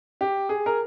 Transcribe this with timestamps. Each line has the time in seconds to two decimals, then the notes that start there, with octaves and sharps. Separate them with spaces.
0.21 G4
0.49 G#4
0.66 A#4